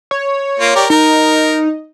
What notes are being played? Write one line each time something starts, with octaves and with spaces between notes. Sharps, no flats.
C#5
A#3 F4
G4 A#4 D5
D#4 A#4